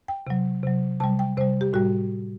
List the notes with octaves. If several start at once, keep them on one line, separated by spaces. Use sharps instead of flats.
G5
C3 F#3
C3 F#3
C3 G3 A5
G5
C3 G3 C5
G4
A2 G3 F#4